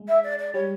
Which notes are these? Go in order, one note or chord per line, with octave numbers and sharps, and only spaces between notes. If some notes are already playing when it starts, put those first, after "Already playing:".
Already playing: G#3
E5
D5
D5
G3 C#5